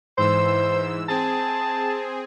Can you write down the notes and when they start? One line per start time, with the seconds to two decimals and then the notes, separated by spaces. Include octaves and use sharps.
0.18 G#2 E3 C5 E6
1.09 C4 G#4 A5